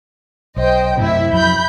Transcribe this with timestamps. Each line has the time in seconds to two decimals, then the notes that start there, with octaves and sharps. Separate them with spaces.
0.57 B1 C5 D#5 G5
0.97 F#2 A2 C3 E4 E5
1.33 F2 F#3 B5 G6